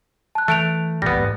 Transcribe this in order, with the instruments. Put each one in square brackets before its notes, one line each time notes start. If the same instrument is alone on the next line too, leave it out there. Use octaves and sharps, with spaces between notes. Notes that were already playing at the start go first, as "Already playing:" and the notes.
[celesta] A5 F#6
[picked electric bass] E3 [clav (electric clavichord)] A3 [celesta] F#6 D7 F7
[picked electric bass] E1 A#1 E2 [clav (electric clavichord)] G3 B3 [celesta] A#6
[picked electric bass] G#2